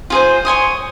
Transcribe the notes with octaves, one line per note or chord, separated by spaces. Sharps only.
F4 G#4 C5
C#5 G#5 C6 D#6